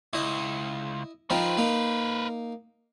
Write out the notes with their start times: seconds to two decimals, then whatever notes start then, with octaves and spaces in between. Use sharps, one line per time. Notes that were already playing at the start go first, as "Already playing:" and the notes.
0.13 C#2 E4 D#5
1.30 F3 C4 D#4 A#4 B4
1.57 A#3 D#4